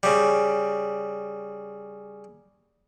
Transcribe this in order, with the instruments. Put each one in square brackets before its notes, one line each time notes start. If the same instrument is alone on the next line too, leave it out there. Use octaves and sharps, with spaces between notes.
[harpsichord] C#3 G3